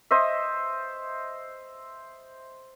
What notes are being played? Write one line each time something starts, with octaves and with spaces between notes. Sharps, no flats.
C5 D#5 E5